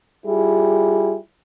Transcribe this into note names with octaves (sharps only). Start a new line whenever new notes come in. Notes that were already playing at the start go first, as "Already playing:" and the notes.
G3 E4 F4 G#4